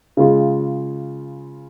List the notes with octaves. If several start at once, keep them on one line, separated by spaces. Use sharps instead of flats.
C#3 G#3 F4